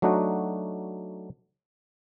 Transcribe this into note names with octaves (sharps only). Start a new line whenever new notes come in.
F#3 A3 D4 D#4 F#4